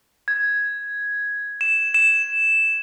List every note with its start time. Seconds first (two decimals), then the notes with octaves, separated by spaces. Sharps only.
0.28 G#6
1.61 E7
1.94 E7